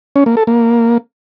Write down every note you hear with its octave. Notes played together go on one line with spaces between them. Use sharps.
C#4
A#3
A4
A#3